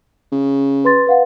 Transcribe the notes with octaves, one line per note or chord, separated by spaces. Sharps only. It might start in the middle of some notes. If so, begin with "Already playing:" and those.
C#3
B4 C6 A6
B4 F5 F#5